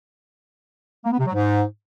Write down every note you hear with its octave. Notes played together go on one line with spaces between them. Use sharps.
A#3
B3
C3
F#3
G#2